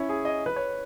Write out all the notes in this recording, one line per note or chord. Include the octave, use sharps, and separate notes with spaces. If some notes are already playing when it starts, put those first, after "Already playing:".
Already playing: C#4 E4
G#4
D#5
B4
C#5